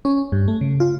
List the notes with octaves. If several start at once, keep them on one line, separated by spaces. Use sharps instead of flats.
C#4
G2
A3
C#3
F4